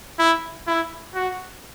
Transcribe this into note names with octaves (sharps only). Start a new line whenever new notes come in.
E4
E4
F#4